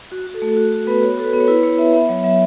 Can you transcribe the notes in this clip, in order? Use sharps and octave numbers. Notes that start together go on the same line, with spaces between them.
F#4
F#4
A4
A3
A4
F#4
F#4
B3 B4
F#4 C#5
F#4 A4
B4
B3
C#5
E4 B4
E4 C#5
B3 E5
B3 E5
F#3 C#5
F#3 E5